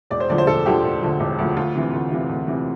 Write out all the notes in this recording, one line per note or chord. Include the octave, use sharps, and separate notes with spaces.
E1 D5
C5
D2 D3 F3 D5
C5
E1 A4
D2 D3 F3 G4
E1
D2 D3 F3
E1
D2 D3 F3
D2 F4
C3 E3
D2
C3 E3
D2
C3 E3